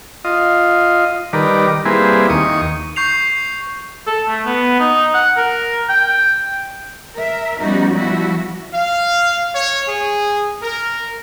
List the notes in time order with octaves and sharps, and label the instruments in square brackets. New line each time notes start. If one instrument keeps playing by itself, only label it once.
[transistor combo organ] F4 D#5
D#3 G3 A#4 B4 D5
G3 A#3 C4 E4 G#4 B4
D#2 C#6 D#6
[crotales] C#6 G6 C7 F7
[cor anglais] A4
A3
B3
D#4
F#5
A#4
G5
[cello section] A#4 E5
F3 G3 B3 C#4 D#4 F#4
F3 G3 E4 F#4 E5
[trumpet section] F5
C#5
G#4
A#4